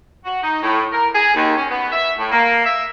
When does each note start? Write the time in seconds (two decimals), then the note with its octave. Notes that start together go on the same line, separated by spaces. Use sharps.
0.24 F#4
0.43 D#4
0.63 A2
0.93 A#4
1.14 G#4
1.35 D#2
1.56 C#4
1.70 B3
1.92 E5
2.18 A2
2.31 A#3
2.65 E5